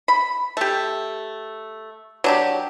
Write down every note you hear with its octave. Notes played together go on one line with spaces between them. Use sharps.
B5
A3 G4
F#3 D4 G4